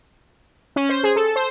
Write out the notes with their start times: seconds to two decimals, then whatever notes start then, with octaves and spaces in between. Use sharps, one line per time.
0.76 C#4
0.89 C5
1.03 G#4
1.16 A4
1.36 C5